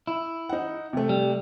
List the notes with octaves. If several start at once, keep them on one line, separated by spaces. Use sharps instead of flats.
E4
D#4 F#5
C3 A3
G3